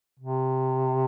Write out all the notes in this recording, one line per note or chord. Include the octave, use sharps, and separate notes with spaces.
C3